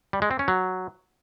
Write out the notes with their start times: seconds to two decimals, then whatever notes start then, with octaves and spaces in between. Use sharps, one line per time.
0.13 G3
0.22 G#3
0.31 C4
0.39 C#4
0.48 F#3